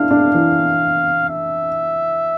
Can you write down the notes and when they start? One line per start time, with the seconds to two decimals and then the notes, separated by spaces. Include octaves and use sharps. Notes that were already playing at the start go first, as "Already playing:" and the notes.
Already playing: D4 E4 F5
0.11 D4
0.35 E3
1.29 E5